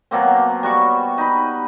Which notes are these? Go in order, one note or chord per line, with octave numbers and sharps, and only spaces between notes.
B2 F#3 A#3 C4
G3 F#4 B5 C#6
D#4 B5